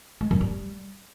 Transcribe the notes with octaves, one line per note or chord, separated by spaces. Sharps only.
G#3
F#2
G3